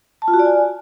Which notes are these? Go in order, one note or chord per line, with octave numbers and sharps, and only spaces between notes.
A5
F4
F#4
D5
G#5